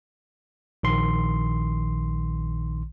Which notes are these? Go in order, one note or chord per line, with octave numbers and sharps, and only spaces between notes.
A#1 D#3 C6